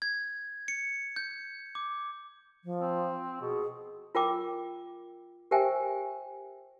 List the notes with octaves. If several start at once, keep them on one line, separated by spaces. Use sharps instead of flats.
G#6
C#7
G6
D6
F3
C4
B2 G#4
F4 A#4 G5 D6
G4 A#4 C5 E5 G5 G#5